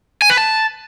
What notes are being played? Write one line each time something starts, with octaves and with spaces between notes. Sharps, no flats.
G#5
B4
A5